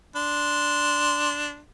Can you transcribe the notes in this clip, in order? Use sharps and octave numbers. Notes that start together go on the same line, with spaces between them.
D4 C6